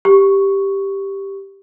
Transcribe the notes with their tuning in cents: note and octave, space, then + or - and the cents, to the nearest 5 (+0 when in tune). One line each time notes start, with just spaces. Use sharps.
G4 +0 C#6 +0